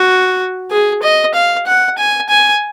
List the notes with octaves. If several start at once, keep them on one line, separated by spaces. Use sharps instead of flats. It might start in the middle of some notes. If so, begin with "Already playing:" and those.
Already playing: F#4
G#4
D#5
F5
F#5
G#5
G#5